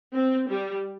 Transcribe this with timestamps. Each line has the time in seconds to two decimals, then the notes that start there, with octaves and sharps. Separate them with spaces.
0.12 C4
0.48 G3